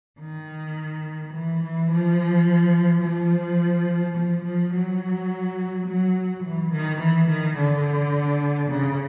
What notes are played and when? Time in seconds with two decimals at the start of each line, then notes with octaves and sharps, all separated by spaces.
0.20 D#3
1.33 E3
1.63 E3
1.90 F3
3.03 F3
4.17 F3
4.45 F3
4.74 F#3
5.86 F#3
6.44 E3
6.72 D#3
6.99 E3
7.28 D#3
7.57 D3
8.70 C#3